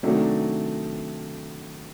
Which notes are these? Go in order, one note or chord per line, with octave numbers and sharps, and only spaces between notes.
C3 D#3 F#3 A3 D4